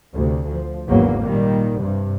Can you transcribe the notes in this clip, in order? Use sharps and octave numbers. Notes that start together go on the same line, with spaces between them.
D2 C3
F3
G#1 E2 C#3 F#3 A#3
A#2 D#3 G3
G2 C3